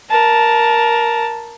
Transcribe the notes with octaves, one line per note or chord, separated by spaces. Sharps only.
A#4 A5